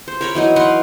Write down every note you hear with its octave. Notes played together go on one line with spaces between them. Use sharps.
C5
A#4 C#5 B5
E3 F#3 D#4
A#4 B4 F#5 C6